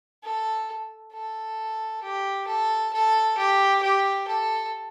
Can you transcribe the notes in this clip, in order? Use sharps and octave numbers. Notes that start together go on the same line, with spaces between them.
A4
A4
G4
A4
A4
G4
G4
A4